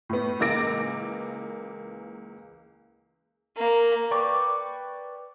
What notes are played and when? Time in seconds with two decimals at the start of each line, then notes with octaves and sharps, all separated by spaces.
0.09 A2 B3
0.40 C#2 E3 A#3 D6 A#6 D7
3.57 A#3
4.11 B4 D5 G5 C#6 D6